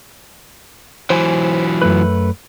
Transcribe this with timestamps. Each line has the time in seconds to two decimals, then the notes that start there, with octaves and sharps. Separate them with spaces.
1.10 E3 F#3 C5 G#5
1.82 F#2 A3 B4